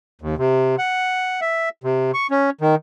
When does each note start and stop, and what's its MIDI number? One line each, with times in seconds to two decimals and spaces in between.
0.21 0.35 39
0.38 0.76 48
0.79 1.40 78
1.41 1.69 76
1.84 2.11 48
2.14 2.27 85
2.31 2.50 61
2.61 2.75 51